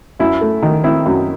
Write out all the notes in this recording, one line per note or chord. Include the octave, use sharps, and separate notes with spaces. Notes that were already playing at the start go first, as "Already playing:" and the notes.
F#2 E4
A3
D#3
C4 E4
F#2